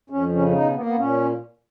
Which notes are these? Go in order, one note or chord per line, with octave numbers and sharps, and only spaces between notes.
F2 C#4
C#3 C#4
C#4
B2 D#4
A#3 B3
B3
A#2 C#4